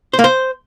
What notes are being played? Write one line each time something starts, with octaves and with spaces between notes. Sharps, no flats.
C5
A#3
C5